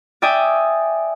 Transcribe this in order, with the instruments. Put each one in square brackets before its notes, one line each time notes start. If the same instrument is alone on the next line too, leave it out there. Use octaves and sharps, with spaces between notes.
[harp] D5 E5 G5 G#5 D#6